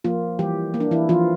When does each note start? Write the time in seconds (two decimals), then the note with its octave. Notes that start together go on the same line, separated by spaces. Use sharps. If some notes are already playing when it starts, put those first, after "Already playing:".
0.04 F3 A#3 F4
0.39 E3 G3 G4
0.74 A#3
0.80 D4
0.91 E3 E4
1.09 E3 F3 F4